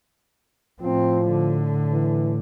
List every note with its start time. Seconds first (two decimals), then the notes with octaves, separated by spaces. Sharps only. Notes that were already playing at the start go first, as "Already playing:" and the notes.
0.81 A2 F3 C4
1.25 D3
1.92 E3